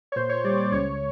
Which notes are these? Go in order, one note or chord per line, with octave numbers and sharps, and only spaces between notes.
C#5
A#2 C5
C#5
G3 D5
D5
C#2 C#5